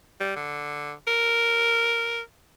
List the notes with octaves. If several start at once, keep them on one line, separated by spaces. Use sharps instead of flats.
G3
D3
A#4